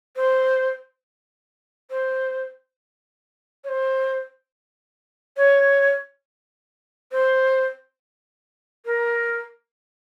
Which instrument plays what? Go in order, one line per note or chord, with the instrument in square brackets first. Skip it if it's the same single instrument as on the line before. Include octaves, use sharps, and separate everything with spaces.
[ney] C5
C5
C#5
C5
C#5
C5
A#4